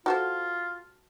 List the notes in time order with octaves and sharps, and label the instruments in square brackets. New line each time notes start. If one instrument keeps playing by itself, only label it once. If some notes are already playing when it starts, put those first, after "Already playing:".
[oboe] F4 [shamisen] F#4 A4 C5